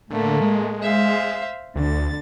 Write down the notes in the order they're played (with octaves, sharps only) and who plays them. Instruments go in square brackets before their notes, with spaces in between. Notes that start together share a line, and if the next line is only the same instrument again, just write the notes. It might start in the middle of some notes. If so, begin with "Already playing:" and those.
[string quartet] A2 A3 A#3 [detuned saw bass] D3
[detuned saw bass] G#3
[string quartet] C5 E5 F5
[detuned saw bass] D2 [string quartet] D3 A6